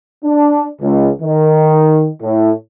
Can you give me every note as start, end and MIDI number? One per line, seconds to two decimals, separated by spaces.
0.24 0.65 62
0.82 1.08 37
1.22 2.08 51
2.21 2.51 45